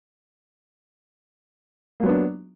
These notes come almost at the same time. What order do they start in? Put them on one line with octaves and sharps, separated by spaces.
A#3 F#3 B3 D4